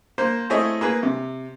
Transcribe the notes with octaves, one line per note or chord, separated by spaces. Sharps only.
A#3 C5
A3 C4 E4 G#4 C#5 D#5
A#3 G#4 B4
C3